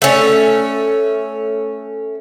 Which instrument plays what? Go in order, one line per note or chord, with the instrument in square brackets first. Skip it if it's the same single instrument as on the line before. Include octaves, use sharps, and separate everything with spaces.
[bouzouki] A3 C#4